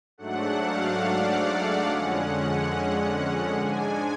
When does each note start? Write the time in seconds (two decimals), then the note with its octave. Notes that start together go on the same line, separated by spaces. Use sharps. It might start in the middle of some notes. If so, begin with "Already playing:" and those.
0.18 G#2 F#3 A3 D4 F#5
0.60 F5
1.03 D5
1.87 F2 D3 G#3 C#4 F#5
3.56 G#2 G#3 D4 G#5